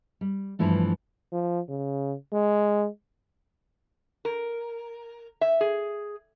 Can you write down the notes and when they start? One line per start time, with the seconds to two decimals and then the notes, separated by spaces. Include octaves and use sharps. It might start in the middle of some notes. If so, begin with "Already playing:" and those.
0.21 G3
0.59 G2 E3 F3 A3 D4
1.32 F3
1.69 C#3
2.33 G#3
4.25 A#4
5.41 E5
5.61 G#4